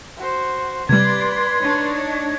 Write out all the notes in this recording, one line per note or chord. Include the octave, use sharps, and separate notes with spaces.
F#4 C5
C3 G3 B4 D5 C6 G#6
D4 D#4 C#5